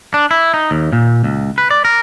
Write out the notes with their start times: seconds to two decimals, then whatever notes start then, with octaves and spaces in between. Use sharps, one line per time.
0.14 D4
0.31 E4
0.54 D#4
0.71 D#2
0.93 A#2
1.24 C#2
1.58 B4
1.71 D5
1.85 A#4